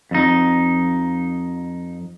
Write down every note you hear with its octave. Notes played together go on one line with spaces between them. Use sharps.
F2 D#4